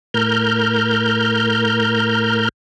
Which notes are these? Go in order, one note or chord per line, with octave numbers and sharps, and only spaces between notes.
A2 A#4 F6 G6